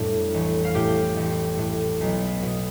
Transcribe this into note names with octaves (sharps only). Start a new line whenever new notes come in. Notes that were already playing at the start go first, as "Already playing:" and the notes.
Already playing: F2 A2 G3 D4
A1
F5
A2 G4 G5
A1
A2
B1
B2